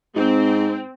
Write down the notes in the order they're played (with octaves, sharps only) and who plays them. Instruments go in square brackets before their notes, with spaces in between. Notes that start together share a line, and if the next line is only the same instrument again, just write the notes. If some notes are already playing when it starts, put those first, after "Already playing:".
[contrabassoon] G#2 [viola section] C4